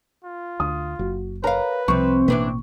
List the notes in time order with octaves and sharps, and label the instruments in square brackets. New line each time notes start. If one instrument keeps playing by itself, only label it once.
[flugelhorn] F4
[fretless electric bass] D2 [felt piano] D#6
[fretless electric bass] F#1 [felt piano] F#4
[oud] A#4 F5 [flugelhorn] B4 [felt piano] C#5 A#5
[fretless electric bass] C2 F3 [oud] C3 C4 [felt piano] C#6
[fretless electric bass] A1 B2 A#3 [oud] E3 D4 B4 [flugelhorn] C4